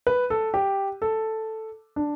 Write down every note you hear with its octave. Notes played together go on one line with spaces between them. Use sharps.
B4
A4
G4
A4
D4